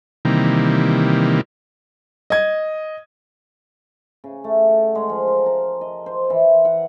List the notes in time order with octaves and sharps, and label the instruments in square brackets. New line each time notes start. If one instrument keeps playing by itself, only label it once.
[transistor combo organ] C3 D#3 E3 G3 A#3
[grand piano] D#5 G#6
[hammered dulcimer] C#3
A3
F#5
G#3
F3
A#4
A#5
D#5
C5
E3
F#5